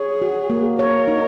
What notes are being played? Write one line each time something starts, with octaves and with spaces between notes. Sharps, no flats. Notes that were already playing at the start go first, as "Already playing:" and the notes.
Already playing: G#4 C#5
F#4
A#3
A#4 C#5
D#4